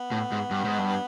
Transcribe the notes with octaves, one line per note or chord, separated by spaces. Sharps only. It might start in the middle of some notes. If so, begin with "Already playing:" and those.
Already playing: B3
A2
G#2
G2
G#2
G2